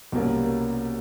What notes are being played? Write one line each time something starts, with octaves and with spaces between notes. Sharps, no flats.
C2 B2 G3 A#3 C#4